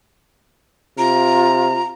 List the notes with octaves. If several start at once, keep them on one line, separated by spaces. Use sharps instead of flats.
C3 F4 A#5